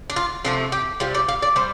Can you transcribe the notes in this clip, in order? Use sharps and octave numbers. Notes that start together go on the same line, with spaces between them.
D4
F4
C3 F3 A3 D4
G4
C3 G3 F4
D5
F5
D5
G3 C5